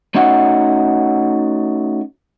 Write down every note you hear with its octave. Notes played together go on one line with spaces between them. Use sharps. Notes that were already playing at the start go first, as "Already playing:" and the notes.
A3 C#4 D#4 F#4 F#5